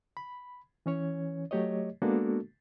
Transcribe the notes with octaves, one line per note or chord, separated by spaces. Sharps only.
B5
E3 C#4 C#5
F#3 A3 G4 C#5 D#5
G#3 A#3 B3 D4 F#4 A4